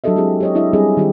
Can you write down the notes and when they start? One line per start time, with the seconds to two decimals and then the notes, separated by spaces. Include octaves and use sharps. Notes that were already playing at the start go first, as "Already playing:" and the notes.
0.04 F#3 D4 G4 A4 D#5 E5
0.16 F#3 G#3 C4 E4 G4 G#4
0.40 G4 C#5 D#5
0.55 D4 E4 G4 D#5 E5
0.73 G3 C4 C#4 G#4 D#5
0.97 D#3 G3 F4 G4